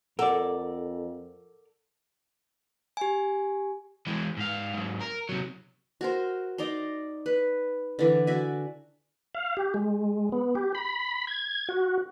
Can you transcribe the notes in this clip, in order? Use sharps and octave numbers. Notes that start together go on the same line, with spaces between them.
F2 A4 A#4 D5 F#5
G4 G#5
E3 G#3
G#2 F5
G#2 F#3
A#4
C3 F#3
F#4 A#4 C5
D#4 D5 A#5 C6
B4
D3 E3 D5
F#4 D5 E5 G#5
F5
G4
G#3
B3
G4
B5
G#6
F#4